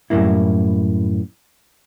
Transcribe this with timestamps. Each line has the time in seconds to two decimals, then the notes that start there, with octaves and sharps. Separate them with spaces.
0.10 F#2 A2 D3 G3 A#3 E4